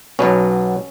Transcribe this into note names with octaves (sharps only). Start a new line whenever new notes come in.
B1 B2 F#3 B3 C#4